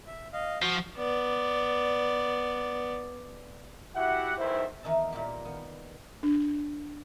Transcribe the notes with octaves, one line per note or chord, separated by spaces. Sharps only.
E5
D#5 F5
F3 F#4
B3 D5
E4 F#4 G4 E5 F#5
B1 E2 D#3 E4 C5 E5
E2 D#3 D#4 E5 A5
A#2 G3 A#3 F4 G4
D#3 B3
D4